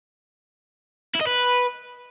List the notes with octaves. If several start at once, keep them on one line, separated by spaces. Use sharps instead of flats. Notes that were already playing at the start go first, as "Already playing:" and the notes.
E4
D#5
B4